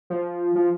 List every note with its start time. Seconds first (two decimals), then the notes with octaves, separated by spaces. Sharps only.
0.10 F3
0.55 F3